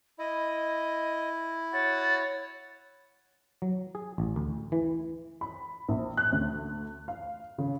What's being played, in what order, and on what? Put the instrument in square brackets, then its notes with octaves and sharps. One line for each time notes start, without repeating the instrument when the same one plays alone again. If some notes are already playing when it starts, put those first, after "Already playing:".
[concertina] E4 [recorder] D#5
[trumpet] F#4 [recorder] C#5 [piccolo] A6
[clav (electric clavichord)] F#3
G#4
A1
D2
E3
[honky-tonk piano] B5
A#1
F#6
D2
F5
C#3